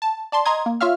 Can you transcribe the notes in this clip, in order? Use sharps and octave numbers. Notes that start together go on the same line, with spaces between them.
A5
D5 A5 C6
D#5 A#5 C6 D#6 G#6
A#3
F4 C#5 E5 F5 F6